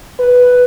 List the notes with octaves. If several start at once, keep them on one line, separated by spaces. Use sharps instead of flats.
B4